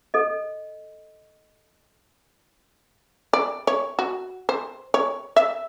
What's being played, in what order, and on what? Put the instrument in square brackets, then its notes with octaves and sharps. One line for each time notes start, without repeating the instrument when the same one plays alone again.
[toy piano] A4 D#5
[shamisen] D5
C#5
F#4
C5
C#5
E5